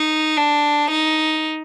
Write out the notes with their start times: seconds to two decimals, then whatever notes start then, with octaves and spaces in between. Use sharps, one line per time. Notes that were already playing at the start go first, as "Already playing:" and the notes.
Already playing: D#4
0.37 D4
0.90 D#4